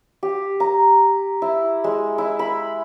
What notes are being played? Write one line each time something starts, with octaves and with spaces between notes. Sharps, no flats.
G4
A#5
E4
G#3
E4
B5